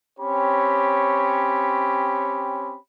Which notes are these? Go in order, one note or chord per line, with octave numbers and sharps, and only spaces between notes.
C4 C#4 G4 C#5 B5